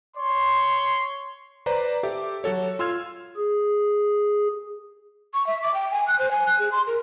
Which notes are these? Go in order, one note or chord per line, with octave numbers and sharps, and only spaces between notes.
C#5 C6
B4 C5 D5 A#5
G4 A4 E5 D6
F#3 F#4 A4 C#5
F4 C6 E6 F6 G#6
G#4
C#6
E5
D6
G5
G#5
F#6
C5
G#5
F#6
G#4
C6
A#4